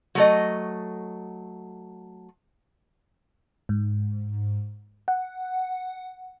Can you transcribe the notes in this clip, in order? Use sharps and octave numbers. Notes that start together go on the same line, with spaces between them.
F#3 A3 D#5
G#2
F#5